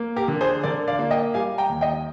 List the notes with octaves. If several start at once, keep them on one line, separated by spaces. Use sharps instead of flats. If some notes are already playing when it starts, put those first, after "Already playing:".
Already playing: A#3
G4 A#4
D3
G#4 C5
D3 A#4 D5
D5 F5
A#3
D#5 G5
G3 F5 G#5
G5 A#5
D#2
D#5 G5